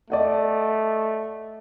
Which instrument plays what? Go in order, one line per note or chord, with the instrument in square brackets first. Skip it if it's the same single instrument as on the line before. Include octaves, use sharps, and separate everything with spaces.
[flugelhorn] A3 [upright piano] D5 D#5 F#5